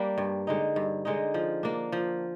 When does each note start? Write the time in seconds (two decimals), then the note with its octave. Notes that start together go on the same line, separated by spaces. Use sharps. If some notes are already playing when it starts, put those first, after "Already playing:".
Already playing: G3 A#3 D4
0.18 G2
0.47 D3 G#3 D#4
0.76 G2
1.05 D3 G#3 D#4
1.34 F3
1.63 A#3 D4
1.92 F3